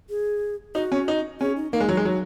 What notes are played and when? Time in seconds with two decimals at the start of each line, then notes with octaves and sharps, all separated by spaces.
0.10 G#4
0.75 D#4 F#4
0.92 C#4
1.08 D#4
1.41 C#4 G#4
1.56 D#4
1.73 A#3 D#4
1.80 G#3
1.89 F#3
1.97 G#3
2.05 F#3